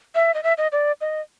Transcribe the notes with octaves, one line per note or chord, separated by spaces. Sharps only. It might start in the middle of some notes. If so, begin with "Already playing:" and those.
E5
D#5
E5
D#5
D5
D#5